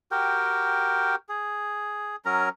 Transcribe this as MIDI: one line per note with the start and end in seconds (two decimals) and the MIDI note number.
0.11 1.15 66
0.11 1.15 67
0.11 1.15 70
0.11 1.15 79
1.29 2.16 68
2.25 2.49 54
2.25 2.49 61
2.25 2.49 70
2.25 2.49 82